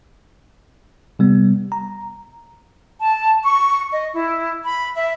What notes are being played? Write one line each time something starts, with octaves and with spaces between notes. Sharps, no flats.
C3 G3 B3
A#5
A5
C#6
D#5
E4
B5
E5